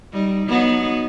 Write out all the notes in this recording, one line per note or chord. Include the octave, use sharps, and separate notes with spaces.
G3 D#4
F#3 B3 D#4